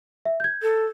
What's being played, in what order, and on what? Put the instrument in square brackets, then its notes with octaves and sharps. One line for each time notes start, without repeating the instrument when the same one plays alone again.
[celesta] E5
G6 G#6
[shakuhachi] A4